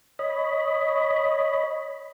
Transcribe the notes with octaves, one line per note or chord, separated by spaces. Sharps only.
C#5 D#5 B5